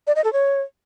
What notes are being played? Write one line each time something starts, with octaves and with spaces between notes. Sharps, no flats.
D5
D#5
A4
C#5